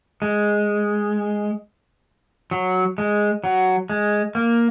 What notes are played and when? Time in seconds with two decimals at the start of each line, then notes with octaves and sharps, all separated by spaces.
0.22 G#3
2.51 F#3
2.98 G#3
3.44 F#3
3.90 G#3
4.35 A#3